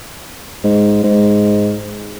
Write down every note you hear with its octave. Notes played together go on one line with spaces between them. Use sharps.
G#2
G#2